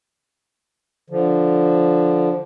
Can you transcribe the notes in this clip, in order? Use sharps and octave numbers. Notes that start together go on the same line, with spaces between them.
D3 F3